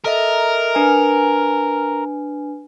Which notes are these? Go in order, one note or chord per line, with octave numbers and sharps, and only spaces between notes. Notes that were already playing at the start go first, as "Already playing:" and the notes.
A4 A#4 D#5 E5
D4 B4 G#5